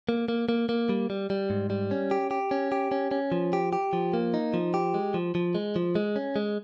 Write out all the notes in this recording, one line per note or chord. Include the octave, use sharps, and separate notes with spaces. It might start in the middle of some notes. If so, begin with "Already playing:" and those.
A#3
A#3
A#3
A#3
G3
G3
G3
G#2
G3
C#4
G4
G4
C#4
G4
C#4
C#4
F3
G4
G4
F3
A#3
D#4
F3
G4
G#3
F3
F3
G#3
F3
G#3
C#4
G#3